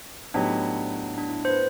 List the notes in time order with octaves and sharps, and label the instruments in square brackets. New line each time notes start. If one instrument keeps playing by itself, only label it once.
[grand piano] A2 F#3 B3 D#4 G4 [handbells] D4
[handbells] D4
E4
C5
B4